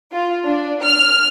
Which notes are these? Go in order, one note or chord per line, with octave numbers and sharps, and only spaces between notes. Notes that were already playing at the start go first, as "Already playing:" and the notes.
F4
D4
F6